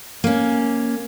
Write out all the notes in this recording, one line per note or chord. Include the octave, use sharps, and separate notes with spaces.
A#3 C#4